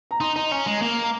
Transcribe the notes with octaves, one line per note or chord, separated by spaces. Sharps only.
A#5
D#4 C6
D#4 A#5
C#4 A#5
G#3
A#3
A#5